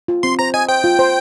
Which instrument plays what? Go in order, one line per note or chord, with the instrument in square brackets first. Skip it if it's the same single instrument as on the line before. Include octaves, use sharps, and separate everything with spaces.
[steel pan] F4
[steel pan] C4 [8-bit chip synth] C6
[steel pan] C5 [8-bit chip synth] A#5
[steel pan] D#5 [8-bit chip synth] G#5
[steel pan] C5 [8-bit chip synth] G5
[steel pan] F4
C5